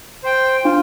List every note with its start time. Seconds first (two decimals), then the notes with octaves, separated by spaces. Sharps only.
0.24 C5 G5
0.64 D4 F4